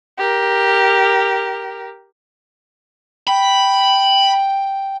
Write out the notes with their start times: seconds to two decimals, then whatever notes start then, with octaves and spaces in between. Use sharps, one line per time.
0.18 G4 A#4
3.28 G5 B5